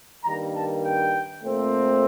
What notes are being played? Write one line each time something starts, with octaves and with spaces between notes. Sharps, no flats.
G2 D#3 G3 A#3 A#5
A5
G5
A#2 A3 C4